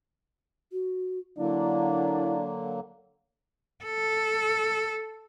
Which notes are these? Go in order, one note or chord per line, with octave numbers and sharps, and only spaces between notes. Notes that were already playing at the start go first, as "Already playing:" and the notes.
F#4
D3 F#3 A#3 D4 E4
A4